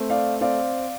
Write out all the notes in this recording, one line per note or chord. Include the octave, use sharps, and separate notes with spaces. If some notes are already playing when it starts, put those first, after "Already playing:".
Already playing: A3 C4
D5 F5
C4 D5 F5